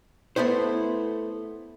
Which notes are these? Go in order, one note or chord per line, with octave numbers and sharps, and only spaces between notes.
A3 B3 E4 C5